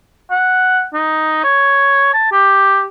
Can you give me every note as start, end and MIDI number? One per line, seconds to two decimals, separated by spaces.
0.31 0.84 78
0.93 1.41 63
1.44 2.13 73
2.13 2.31 81
2.32 2.86 67